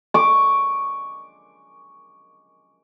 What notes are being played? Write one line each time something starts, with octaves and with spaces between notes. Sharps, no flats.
C#6 D6